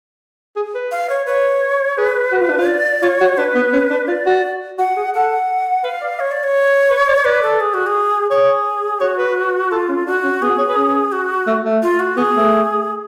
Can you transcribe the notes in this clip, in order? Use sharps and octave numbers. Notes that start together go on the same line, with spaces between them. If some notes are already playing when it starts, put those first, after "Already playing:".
G#4
B4
F5
C#5
B4 C#5
G#4 B4
F#4
F4
D4
F4
D5
F4 C#5
F#4
D4 B4
B3
C#4
D4
F4 D5
F#4
F#4 F#5
G#4
A4 F#5
B4 F5
D5
C#5
D5
C#5
B4
D5
B4 D5
A4
G#4
F#4
G#4
G#4 C#5
F#4 C#5
B4
F4 A4
C#4
D4 F#4
C#4
B3 G#4
F#4
C#5
B4
C#4
F#4
A3
A3
F4
F#4
B3 G#4
A3